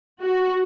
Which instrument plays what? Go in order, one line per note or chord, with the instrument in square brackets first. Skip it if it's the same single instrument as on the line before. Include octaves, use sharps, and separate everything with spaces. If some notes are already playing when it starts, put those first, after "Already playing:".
[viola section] F#4